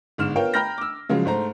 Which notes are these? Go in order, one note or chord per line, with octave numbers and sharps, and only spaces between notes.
G1 G#2 F6 E7
B3 F4 A#4 C#5 G5
G5 A#5 B5 F6 G6 A#6
D6 E6
C#3 F3 F#3 G#3
G#2 A3 C5 A#5